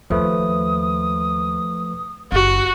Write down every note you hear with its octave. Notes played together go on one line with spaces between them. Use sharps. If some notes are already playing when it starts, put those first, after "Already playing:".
D#2 F3 A3 B4 D#6
F#1 F#4